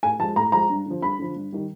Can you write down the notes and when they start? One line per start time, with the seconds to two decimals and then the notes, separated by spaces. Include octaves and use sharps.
0.03 A2 G#5
0.20 F3 A5
0.23 G#3
0.36 A2 A#5
0.52 F3 G#3 A#5
0.69 G2
0.86 D3 F3
1.02 G2 B5
1.19 D3 F3
1.36 G2
1.53 D#3 G3